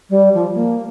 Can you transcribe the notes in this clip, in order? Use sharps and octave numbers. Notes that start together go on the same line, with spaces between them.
G3
F3
A#3